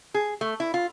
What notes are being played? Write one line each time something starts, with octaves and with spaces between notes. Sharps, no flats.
G#4
A3
E4
F4